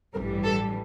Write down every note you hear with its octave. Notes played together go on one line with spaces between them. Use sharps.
A1 G2 E3 G3 A#4
A4